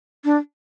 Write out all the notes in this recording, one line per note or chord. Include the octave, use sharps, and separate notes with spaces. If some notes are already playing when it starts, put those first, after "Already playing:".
D4